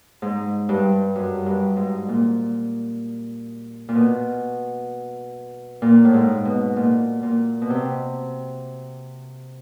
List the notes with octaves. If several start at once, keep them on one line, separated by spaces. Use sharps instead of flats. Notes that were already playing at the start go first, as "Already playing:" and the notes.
G#2
G2
F#2
G2
G#2
A#2
A#2
B2
A#2
A2
G#2
B2
A#2
A#2
B2
C3